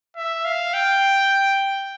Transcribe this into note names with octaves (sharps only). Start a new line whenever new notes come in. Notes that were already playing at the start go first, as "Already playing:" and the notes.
E5
F5
G5